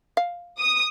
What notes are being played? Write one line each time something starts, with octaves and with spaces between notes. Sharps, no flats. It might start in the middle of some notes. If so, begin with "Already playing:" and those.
F5
D#6